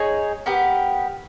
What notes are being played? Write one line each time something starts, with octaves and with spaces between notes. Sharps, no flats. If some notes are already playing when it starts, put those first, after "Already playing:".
Already playing: D#4 G#4 C#5 G#5
B3 G4 A#4